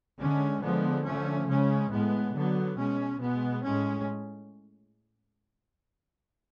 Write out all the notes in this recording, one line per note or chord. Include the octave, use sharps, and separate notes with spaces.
D3 G#3 C#4
D3 F3 G#3 B3
D3 F3 A3 C#4
C#3 G#3 C#4
A2 G#3 B3
D3 F#3 B3
B2 G#3 C#4
B2 G#3 B3
A2 G#3 C#4